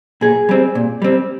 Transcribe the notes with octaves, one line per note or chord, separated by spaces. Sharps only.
A#2 G#4
G3 C4
A#2
G3 C4